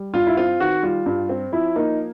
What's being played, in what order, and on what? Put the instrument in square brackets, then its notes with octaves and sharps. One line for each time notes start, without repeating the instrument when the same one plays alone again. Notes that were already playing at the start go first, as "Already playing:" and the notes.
Already playing: [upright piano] G3
[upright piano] G2 [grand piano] F4
[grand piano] E4
[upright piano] C4 [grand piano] F4
[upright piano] D#3 [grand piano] F#4
[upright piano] G3 [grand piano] F4
[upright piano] G2 [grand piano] F4
[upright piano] C4
[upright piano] F3 [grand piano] E4
[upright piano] A#3 [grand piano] D#4